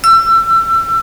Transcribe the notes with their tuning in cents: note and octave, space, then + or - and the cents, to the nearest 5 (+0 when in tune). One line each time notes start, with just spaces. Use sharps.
E6 +30